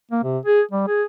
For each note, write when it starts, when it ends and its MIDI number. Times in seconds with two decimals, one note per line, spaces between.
0.11 0.23 58
0.24 0.38 48
0.46 0.61 68
0.71 0.86 55
0.87 1.03 68